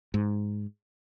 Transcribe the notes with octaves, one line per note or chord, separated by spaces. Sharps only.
G#2